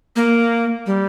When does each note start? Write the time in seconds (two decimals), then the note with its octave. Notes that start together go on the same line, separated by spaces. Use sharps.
0.16 A#3
0.86 G3